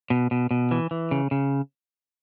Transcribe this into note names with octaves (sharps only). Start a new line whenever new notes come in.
B2
B2
B2
E3
E3
C#3
C#3